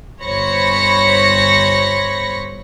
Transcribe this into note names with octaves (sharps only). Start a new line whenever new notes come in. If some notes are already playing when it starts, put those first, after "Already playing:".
G1 C5 C#5 B5 A#6 C#7